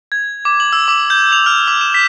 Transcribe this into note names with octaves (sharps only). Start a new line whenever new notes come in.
G#6
D6
F#7
E6
D6
G6
F7
F6
D6
E7
B6